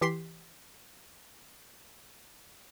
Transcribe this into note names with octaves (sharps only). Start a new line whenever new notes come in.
E3 G4 C6 B6 C7